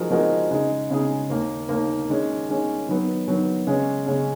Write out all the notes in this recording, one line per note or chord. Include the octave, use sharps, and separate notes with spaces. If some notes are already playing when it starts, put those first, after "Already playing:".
Already playing: F3 G#3 D#4 F#4 A#4
F3 G#3 D#4 F#4 A#4
C#3 G#3 D#4 G#4
C#3 G#3 D#4 G#4
D#2 D#3 A#3
D#2 D#3 A#3
D#3 G#3 C#4
D#3 G#3 C#4
D#3 F#3 B3
D#3 F#3 B3
C#3 G#3 C#4
C#3 G#3 C#4